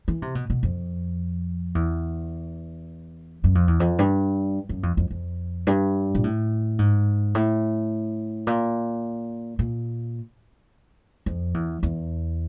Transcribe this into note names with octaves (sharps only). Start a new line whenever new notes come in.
E3
C3
B2
B2
F2
E2
F#2
F2
E2
F2
G2
F#2
F2
F2
F2
G2
A#2
A2
G#2
A2
A#2
A#2
F2
E2
E2